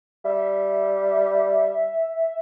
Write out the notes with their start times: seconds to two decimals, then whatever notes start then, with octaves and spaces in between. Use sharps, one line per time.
0.25 G3 E5